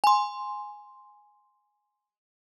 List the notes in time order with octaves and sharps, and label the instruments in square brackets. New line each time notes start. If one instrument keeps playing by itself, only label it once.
[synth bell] G#5 C6